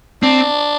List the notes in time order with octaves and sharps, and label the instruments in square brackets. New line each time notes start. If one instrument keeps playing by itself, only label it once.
[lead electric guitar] C4 [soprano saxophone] D4